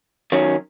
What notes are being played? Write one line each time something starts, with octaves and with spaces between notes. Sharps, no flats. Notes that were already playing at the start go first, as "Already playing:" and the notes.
D#3 F#3 C#4